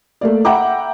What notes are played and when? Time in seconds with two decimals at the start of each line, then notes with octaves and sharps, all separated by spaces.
0.21 A3 A#3 D5
0.45 E5 F#5 G5 A#5 B5 D6